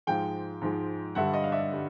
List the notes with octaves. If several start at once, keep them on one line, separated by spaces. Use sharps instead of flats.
G#2 F3 G#3 F5 G5
G#2 F3 G#3
G2 D3 G3 E5 F#5
D#5 F5
F5
D5 E5
D3 G3